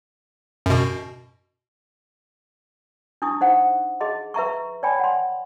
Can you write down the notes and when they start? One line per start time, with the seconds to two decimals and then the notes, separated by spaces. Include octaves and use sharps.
0.66 F#2 B2
3.22 D4 E4 C#6 D#6
3.41 D#4 C5 F#5
4.01 G#4 D#5 C6
4.34 B4 E5 A#5 C#6
4.83 C#5 D5 G5 G#5 B5
4.99 F#5 C6